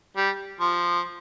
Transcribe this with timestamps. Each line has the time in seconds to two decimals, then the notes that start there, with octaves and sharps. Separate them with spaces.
0.16 G3
0.60 F3